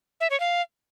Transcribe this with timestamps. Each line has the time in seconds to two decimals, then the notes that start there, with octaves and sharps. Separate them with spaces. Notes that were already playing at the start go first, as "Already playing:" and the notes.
0.20 E5
0.30 C#5
0.40 F5